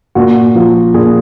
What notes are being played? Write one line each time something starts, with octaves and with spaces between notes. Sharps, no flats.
A#2 F#4
F3
A#2 G#4